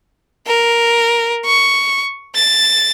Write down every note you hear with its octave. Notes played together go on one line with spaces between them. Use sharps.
A#4
C#6
A6